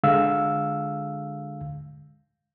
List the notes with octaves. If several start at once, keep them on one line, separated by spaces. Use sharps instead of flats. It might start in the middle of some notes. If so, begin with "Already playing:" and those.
D3 G#3 F5 E6